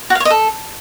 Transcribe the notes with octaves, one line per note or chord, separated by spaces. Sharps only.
F#4
F5
C#5
D#5
A4